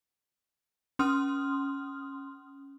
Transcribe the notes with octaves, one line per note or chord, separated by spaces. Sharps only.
C#4 C6 D#6 F6